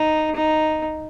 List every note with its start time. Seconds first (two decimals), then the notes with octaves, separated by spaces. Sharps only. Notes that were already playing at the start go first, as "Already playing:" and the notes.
Already playing: D#4
0.36 D#4